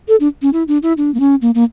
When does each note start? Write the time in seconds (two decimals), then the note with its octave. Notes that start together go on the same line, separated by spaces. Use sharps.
0.08 A4
0.20 D4
0.42 C#4
0.53 E4
0.68 D4
0.83 E4
0.97 D4
1.14 A#3
1.20 C#4
1.42 A#3
1.55 A#3